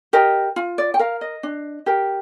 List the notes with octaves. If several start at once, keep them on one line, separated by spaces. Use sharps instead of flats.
G4 A#4 D#5
F4
D5
G5
A#4 F5
D#5
D4
G4 A#4